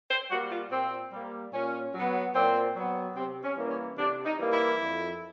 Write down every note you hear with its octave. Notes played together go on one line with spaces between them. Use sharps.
C5
G3 A#3 F#4
F4
A#2 C4
G3 A#3
A#2 C#4
F#3 B3
A#2 C4
F#3 B3
C3 C4
C#4
E3 G3 A#3
C#4
C3 D4
D#4
E3 G3 A#3
E4
F2